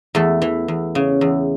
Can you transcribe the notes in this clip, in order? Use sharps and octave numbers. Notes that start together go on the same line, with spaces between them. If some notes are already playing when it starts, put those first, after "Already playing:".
E2 A3
E3
E2
C#3
E2